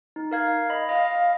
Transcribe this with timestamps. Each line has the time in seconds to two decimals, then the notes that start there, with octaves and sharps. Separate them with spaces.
0.16 D#4
0.31 A#4 F5 G#6
0.70 D#5 B5
0.89 D#5 F5